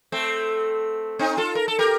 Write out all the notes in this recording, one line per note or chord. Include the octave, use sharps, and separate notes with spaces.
A3 C4
C4 D#4
F4 A4
A#4
A4
G4 A#4